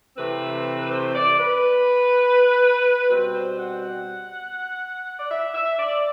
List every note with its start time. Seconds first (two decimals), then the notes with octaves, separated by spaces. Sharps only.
0.17 C3 E3 A3 C4 B4
0.90 C5
1.15 D5
1.39 B4
3.10 B2 G3 C4 B4
3.34 C5
3.59 F#5
5.18 D5
5.29 E5
5.54 E5
5.79 D5